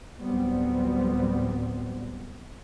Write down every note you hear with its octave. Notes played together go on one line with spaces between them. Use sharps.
A1 D2 F#3 G3 B3 C4